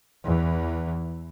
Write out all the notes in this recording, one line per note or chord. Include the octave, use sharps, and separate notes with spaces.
E2 E3